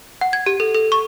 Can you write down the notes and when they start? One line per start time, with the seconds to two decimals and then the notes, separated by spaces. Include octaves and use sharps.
0.21 F#5
0.33 G#6
0.46 G4
0.60 A4
0.74 A4
0.92 C#6